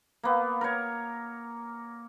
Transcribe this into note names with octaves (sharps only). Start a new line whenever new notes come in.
A#3 B3
A#4 C#5